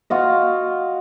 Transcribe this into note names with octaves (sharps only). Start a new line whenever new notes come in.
F4 F#4 D#5